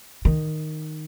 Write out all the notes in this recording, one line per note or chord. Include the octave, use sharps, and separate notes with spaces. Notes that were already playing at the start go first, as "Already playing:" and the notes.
D#3